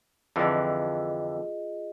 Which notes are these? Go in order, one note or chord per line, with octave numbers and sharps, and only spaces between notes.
F2 D3 E3 F4 G#4 D#5